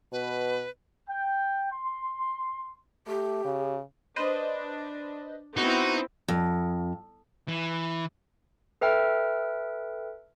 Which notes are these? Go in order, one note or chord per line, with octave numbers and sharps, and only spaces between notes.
B2 B4
G5
C6
A3 G4
C#3
D4 B4 C5 D#5
B3 C4 D#4 E4 F#4
F2
E3
A4 B4 E5 G5 F6